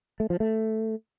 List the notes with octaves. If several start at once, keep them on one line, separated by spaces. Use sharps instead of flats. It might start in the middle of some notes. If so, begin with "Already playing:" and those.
A3
F3
A3